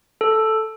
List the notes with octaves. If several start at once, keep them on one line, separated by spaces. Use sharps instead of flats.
A4